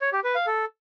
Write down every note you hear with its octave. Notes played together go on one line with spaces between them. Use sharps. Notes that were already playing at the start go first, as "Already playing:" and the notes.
C#5
G4
B4
F5
A4